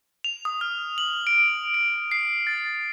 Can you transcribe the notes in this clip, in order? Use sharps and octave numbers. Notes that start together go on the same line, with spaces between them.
F7
D#6
F6
F#7
D7
D7
C7
A6